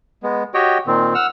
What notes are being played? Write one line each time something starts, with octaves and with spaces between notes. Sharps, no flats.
G#3 B3
F#4 G4 C#5 D#5 G5
A#2 D#3 C4
F#5 E6 F6